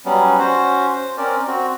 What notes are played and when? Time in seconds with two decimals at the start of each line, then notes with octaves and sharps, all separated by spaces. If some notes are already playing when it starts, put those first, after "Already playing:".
0.05 F#3 G3 B3 C#4
0.39 C#4 F#4 C5
0.93 C5
1.17 C4 C#4 A#4 D5
1.47 C4 F#4